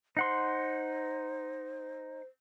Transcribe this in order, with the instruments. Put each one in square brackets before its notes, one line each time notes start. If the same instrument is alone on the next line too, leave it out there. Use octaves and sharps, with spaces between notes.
[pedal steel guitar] D#4 F#5 C6 [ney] C5